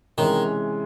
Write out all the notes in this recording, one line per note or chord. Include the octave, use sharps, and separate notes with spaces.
C3 D#3 E3 G#3 C#4